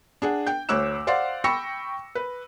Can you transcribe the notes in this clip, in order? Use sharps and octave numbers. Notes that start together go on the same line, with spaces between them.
D4 G#4 F#5
G5 G6
D2 C#5 D6 E6 F#6 E7
C5 D5 F5 F#5 C6 A6
G5 B5 C#6 E6 A#6 C#7
B4